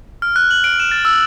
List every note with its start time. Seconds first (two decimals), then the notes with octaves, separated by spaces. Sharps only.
0.22 F6
0.36 F#6
0.51 F#7
0.64 D7
0.80 E7
0.91 A6
1.05 E6